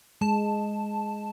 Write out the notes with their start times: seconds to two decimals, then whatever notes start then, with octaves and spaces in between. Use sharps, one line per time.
0.21 G#3 A5